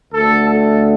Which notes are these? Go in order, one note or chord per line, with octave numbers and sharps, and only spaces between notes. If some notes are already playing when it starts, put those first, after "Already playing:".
D2 D3 A3 A4
A4